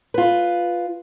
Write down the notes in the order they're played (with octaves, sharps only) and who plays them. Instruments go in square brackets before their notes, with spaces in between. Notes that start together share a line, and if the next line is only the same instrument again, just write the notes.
[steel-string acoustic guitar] F4 B4